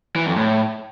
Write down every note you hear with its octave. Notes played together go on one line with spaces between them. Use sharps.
E3
F2
A2